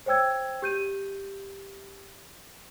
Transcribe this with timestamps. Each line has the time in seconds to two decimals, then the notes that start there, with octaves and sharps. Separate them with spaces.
0.06 C5 C#5 G5 E6 G#6
0.62 G4 G6 D#7